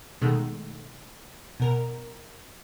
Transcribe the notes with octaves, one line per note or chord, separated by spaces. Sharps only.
B2 D#3 G#3 A3
B2 A#4